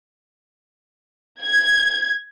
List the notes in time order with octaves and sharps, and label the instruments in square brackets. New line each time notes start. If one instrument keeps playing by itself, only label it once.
[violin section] G#6